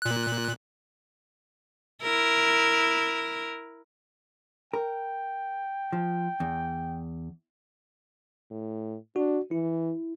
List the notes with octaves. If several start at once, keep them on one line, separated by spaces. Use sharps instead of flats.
A#2 F#6
E4 A#4
A#4 G5
F3
E2
A2
D4 F#4
E3 E4